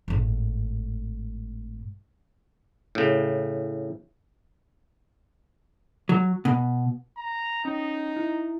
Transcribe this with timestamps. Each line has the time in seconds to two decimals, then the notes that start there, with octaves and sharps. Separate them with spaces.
0.08 G#1 A2
2.95 A2 C#3
6.09 F#3
6.45 B2
7.17 A#5
7.65 C#4 D#4
8.16 E4